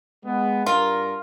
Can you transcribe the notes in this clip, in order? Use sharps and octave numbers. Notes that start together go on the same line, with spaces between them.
G#3 B3
G2 F4 A#4